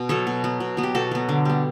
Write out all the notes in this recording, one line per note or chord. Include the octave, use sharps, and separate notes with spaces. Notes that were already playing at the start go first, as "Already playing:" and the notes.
Already playing: B2
F#3 B3 A4 C#5
B2
F#3 B3
B2
F#3 B3
G4
B2 F#4 A4
F#3 B3
D3
G3 B3